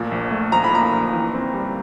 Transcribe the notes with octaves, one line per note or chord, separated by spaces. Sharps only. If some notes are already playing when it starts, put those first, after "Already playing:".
Already playing: A#1 A#2 F3 A3
A#1
A3
F3 A#5
B5
A#2 A#5
A#1
E3
C4
G3